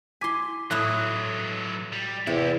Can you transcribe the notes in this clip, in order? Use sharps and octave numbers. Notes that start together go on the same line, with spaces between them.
E4 G#5 C6 D6 B6
A2 E3 F#3 A3 E4 D#6 F#6
G3
E2 C3 E4 G4 E5